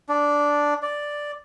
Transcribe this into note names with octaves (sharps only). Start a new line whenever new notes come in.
D4
D5